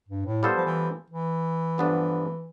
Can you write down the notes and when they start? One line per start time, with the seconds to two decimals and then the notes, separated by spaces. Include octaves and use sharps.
0.08 G2
0.26 A2
0.43 G3 B3 F4 A4 C5
0.57 F3
0.65 E3
1.10 E3
1.78 G2 D3 F3 B3 D4